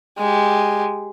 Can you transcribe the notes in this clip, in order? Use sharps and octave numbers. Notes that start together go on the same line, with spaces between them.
G#3 G4